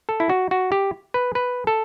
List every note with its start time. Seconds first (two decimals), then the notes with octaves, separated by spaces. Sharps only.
0.09 A4
0.20 E4
0.30 F#4
0.51 F#4
0.72 G4
1.14 B4
1.35 B4
1.67 A4